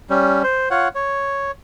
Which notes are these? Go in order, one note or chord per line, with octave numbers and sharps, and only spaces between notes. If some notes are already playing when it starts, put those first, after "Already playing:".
G3 C#4
C5
F4 C#5 F#5
C#5